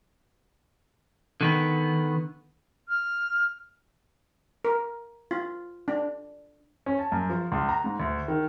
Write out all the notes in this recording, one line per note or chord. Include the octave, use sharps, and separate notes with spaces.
D3 D#3 B3
F6
A#4
F4
D4
C#4
A5
F#2
F3
C#2
A#5
G#2
D2
D#3